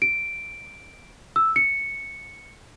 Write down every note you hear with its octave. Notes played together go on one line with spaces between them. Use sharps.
D7
E6
C#7